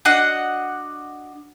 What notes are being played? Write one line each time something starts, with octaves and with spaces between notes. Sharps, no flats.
D4 F#4 D#5 F#5